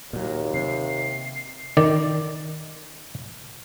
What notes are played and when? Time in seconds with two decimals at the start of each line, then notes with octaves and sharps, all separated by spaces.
0.13 D#2 A#2 F#3
0.54 C3 C7
1.77 D#3 D5